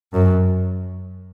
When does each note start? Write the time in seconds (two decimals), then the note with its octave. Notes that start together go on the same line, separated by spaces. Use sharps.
0.13 F#2